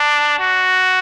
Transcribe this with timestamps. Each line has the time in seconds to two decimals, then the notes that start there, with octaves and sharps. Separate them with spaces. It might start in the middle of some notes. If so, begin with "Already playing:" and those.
Already playing: D4
0.39 F#4